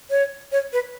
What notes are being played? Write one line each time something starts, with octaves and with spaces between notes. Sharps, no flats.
C#5
C#5
B4